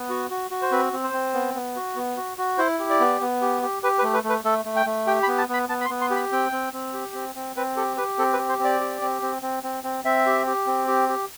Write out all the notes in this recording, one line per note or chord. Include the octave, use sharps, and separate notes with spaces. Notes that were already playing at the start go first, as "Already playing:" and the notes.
Already playing: B3
F#4
F#4
F#4
C5
C4 B4
C4
C5
C4
B3
B3
F#4
B3
F#4
F#4
E4 C5
G4
D5
B3
B3
G4
G4
G4 B4
B4
A3
B4
A3
B4
A3 A4
A3
G5
A3
G4 G5
B5
B3
A5
B3 B5
B3 A5
B5
C6
B3
C6
G4
B5
C4 G5
C4
C4
G4
C4
C4
C4 B4
G4 A4
G4 B4
C4 A4
B4
G4
C5
C4
D5
G4
C4
C4
C4
C4
C4
C4 E5
G4
G4
C4
G4
G4